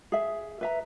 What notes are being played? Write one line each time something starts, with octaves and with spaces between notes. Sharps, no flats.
G#4 E5
B4 E5 A#5